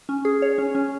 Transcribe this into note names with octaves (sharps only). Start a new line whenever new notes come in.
C#4
G#4
C#5
C#4
C#4